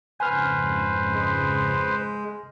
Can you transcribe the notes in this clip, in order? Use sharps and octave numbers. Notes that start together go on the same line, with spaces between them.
F2 G#2 C#3 B4 C5 G#5 F6
G#3